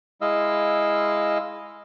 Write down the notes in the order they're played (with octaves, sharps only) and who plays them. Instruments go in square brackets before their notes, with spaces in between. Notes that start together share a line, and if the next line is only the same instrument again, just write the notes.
[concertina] G#3 E4 D#5 F5 E6